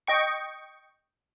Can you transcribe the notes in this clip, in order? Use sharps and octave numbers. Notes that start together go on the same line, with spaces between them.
D#5 G5 C#6